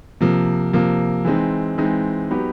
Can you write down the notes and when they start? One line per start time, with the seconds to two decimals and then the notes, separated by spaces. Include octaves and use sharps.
0.21 C3 F3 A#3
0.73 C3 F3 A#3
1.25 E3 G#3 C4 D#4
1.78 E3 G#3 C4 D#4
2.30 F#3 B3 D#4 G4